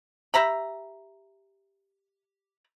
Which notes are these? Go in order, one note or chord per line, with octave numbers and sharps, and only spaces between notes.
G4 E5 A#5 B5